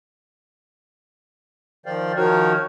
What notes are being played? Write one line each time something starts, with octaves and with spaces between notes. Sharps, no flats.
D#3 F3 C5 D5 F5 G5
D#3 F3 D#4 F#4 A#4 C#5